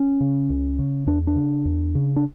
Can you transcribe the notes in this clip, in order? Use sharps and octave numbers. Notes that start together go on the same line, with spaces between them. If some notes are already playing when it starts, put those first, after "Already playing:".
Already playing: C#4
C#3
C#2
C#3
E2 D4
D4
C#3
E2
C#3
D4